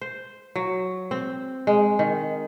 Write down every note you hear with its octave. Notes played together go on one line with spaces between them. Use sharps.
C5
F#3
C4
G#3
D#3